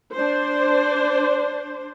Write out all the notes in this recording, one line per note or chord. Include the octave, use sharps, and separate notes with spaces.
D4 C5